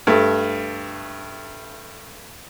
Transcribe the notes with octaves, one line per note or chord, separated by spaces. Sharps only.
G2 A3